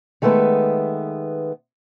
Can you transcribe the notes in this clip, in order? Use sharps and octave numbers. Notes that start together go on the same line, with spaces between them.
D#3 G#3 A3 B3 B4